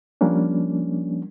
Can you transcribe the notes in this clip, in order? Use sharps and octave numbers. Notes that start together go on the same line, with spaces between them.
F3 G3 A#3 C#4 D4